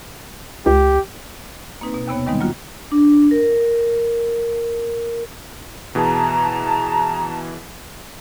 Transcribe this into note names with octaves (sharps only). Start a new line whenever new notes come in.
C#2 G4
A#3 C4 D#4 B4
B2
D#2 C3 B3 C#5
D#3 G3 G#3 B3 C4 D#4
F#3 A#3 F4 F#4
D4
A#4
B2 E3 G#4 A5 A#5